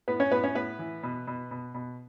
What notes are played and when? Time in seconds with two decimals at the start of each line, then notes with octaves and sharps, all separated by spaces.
0.08 A2 B3 B4
0.20 C#4 C#5
0.32 A2 B3 B4
0.44 C#4 C#5
0.55 A2 B3 B4
0.79 E3
1.03 B2
1.27 B2
1.51 B2
1.74 B2